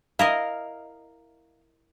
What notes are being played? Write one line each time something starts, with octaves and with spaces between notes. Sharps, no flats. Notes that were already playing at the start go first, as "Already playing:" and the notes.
E4 A#4 D#5 F5